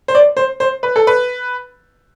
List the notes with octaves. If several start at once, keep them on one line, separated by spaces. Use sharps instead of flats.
C5
D5
C5
C5
B4
A4
B4